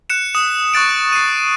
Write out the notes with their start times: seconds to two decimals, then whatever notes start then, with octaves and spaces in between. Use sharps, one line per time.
0.10 F#6 C#7 E7
0.35 D#6 E7
0.74 C#6 F#6 A6 D7
1.12 C7 D#7